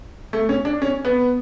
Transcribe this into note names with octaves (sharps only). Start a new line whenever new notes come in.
A3
C#4
D4
C#4
B3